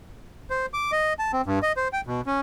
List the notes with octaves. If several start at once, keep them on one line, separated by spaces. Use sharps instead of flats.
C5
D6
D#5
A5
C4
G2
D#5
C5
G5
B2
C#4